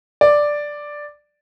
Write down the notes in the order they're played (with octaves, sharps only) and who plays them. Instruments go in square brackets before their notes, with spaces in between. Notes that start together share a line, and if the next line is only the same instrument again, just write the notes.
[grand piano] D5